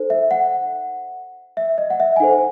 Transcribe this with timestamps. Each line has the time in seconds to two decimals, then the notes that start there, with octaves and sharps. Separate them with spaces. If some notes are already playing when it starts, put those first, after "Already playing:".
Already playing: D#4 A4 C5
0.10 E5
0.31 F#5
1.57 E5
1.78 D#5
1.90 F#5
2.00 E5
2.16 G#5
2.20 D#4 A4 C5 F#5